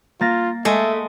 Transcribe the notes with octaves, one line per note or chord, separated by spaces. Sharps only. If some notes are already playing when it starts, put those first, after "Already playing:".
A#3 F4 A6 A#6
G#3 A3 E5